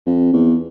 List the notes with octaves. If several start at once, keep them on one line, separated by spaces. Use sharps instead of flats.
F2
E2